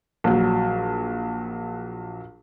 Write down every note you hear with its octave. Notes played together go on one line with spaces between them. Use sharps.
A#1 F#3